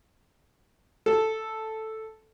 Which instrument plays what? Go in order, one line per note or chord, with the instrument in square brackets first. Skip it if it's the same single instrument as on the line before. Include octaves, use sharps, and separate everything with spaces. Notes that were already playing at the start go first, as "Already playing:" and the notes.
[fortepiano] A4